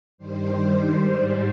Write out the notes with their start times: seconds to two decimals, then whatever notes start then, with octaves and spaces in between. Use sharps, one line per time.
0.18 G2 D#3 G3 C5
0.55 G2 D#3 G3
0.91 G#2 G3